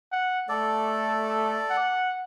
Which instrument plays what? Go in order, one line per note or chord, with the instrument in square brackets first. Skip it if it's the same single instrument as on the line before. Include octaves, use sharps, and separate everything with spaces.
[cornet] F#5
[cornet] A3 [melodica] A4 D5
[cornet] F#5